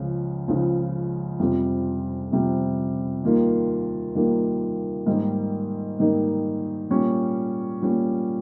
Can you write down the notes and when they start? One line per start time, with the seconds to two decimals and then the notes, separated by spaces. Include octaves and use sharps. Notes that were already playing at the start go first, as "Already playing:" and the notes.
Already playing: C#2 C#3 F3
0.48 C#2 C#3 F3
1.40 F2 C3 G3
2.32 F2 C3 G3
3.23 D#2 D#3 G3 A#3 F4
4.15 D#2 D#3 G3 A#3 F4
5.06 G#2 D#3 G3 A#3 D#4
5.99 G#2 D#3 G3 A#3 D#4
6.90 A#2 G3 C#4
7.81 A#2 G3 C#4